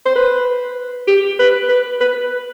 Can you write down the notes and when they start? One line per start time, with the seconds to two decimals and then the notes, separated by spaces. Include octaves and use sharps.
0.06 C5
0.16 B4
1.08 G4
1.39 B4
1.69 B4
2.01 B4